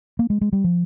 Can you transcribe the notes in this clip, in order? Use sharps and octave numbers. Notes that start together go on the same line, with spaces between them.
A#3
G#3
G#3
G3
F3